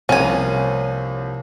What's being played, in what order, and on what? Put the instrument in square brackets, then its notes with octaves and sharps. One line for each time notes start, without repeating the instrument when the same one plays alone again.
[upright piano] C2 [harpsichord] C3 F3 A#3 [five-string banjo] C#4 G#5